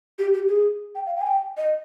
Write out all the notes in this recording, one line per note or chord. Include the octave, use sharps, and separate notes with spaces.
G4
G4
G#4
G5
F5
G5
G#5
G5
D#5